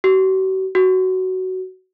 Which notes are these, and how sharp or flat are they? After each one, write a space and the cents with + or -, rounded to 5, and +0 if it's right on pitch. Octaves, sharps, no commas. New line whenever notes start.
F#4 +45
F#4 +15